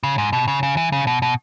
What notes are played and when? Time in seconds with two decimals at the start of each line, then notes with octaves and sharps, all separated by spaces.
0.03 C#3
0.18 G#2
0.33 B2
0.48 C#3
0.63 C#3
0.77 E3
0.92 C#3
1.07 B2
1.22 B2